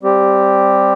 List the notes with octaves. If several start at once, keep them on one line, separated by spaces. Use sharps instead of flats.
G3 C4 G4